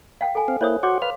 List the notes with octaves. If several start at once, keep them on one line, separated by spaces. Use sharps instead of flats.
F5 G5
A4 G#5
C4 F5
A#3 E4 C5 C#5 D#6
F#4 C#5 F#5 C6 D6
B4 F5 F6